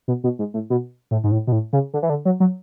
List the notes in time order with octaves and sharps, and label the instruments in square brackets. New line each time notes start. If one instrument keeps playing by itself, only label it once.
[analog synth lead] B2
B2
G#2
A2
B2
A2
G#2
A2
B2
A2
C#3
D3
E3
D3
F#3
F#3